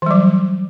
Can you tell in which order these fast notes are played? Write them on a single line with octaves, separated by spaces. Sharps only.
E3 G3 F#3